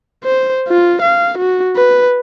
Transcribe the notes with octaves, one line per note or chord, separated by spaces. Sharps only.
C5
F4
F5
F#4
B4